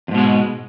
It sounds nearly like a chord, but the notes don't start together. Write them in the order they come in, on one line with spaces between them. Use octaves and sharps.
F2 G#2 B2 G#3